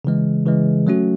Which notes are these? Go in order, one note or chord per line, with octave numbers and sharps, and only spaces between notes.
C#3 E3 G#3
C#3 E3 G#3
F#3 A3 C#4 F#4